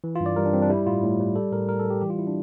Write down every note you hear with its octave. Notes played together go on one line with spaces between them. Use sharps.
E3
G2 F4
D5
G3 A#4
D4
G2 C4
D4
G3 E4
A2 F4
A2
G3
G3 A4
A2 A#4
A2 A#4
A4
G3 G4
E3 G4
F4
E4
D4